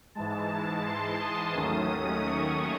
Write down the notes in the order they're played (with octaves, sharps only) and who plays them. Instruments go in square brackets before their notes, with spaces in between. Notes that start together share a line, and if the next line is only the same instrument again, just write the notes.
[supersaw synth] G#2 E3 G#3 A5
C6
D#6
D#2 D#3 F#3 A3 C#4
C#6